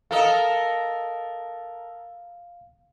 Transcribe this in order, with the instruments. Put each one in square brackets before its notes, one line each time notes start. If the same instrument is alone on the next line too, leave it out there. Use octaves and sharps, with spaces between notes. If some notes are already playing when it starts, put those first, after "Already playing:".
[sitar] A4 A#4 D#5 [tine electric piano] F5